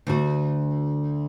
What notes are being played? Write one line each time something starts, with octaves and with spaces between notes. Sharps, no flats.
D2 F#4